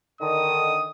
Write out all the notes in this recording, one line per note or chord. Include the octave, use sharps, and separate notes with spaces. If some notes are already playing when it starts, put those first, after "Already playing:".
D3 D#3 D#6